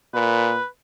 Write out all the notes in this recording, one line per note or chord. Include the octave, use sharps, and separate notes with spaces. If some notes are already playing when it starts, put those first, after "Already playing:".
A#2 B4